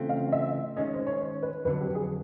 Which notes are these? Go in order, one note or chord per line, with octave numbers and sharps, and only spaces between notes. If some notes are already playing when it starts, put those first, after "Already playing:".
Already playing: C#3 E3 A3 C4 F4
F5
E5
D#3 G#3 C#4 D#5
C5
C#5
C5
B4
F2 D3 F#3 B4
G4
G#4